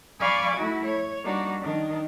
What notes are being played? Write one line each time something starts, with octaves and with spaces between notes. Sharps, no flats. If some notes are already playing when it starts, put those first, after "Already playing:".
D5 F5 G#5 B5 C#6 D6
A3 E4 F#4
C#5
G3 A#3 D4 D#4 F#4
D#3 D4